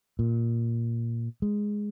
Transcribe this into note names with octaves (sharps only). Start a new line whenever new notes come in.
A#2
G#3